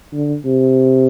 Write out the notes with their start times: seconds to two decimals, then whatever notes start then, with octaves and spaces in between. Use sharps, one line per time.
0.13 D3
0.45 C3